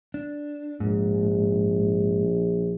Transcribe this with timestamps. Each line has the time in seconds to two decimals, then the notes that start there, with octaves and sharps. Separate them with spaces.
0.14 D4
0.80 A#1 G#2